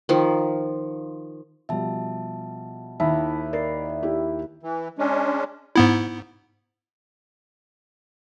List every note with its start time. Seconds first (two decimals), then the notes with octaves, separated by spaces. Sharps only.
0.09 D#3 F3
1.69 B2 F3 G3 E5 A5
3.00 D#2 D#4 E4 A5
3.53 A#4 D5 D#5 A6 C7
4.03 E4 G4
4.63 E3
4.99 G#3 C#4 D4
5.76 G#2 B3 E4